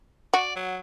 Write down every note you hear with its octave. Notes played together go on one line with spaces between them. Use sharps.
F#4 D5
F#3